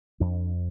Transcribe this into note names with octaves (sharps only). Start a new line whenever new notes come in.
F2 D4